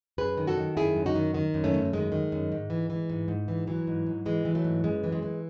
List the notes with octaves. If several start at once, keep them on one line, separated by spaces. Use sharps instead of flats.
F#2 G#4 B4
D#3
F#4 A4
D#3
F#2 E4 G#4
F#2
D#4 F#4
D#3
D#3
F#2
A3 C#4
F#2
D#3 G#3
D#3
F#2
G#2
E3
E3
G#2
G#2
E3
E3 F#3
G#2
G#2
E3 G#3
E3
F#3 A3
G#2
F#2 G#3 B3
E3
G#3
E3